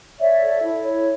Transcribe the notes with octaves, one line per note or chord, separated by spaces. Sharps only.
C#5 D5 E5
A4
E4
C#5